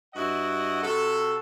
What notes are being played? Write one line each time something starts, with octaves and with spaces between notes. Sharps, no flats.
G2 E4 F#4 D#5 F#5
C3 F#4 A4